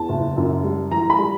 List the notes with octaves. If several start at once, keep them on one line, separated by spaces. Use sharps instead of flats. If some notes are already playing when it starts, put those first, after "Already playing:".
Already playing: E2 A5
F#1
F#2
G3
E3 A#5
B5
G3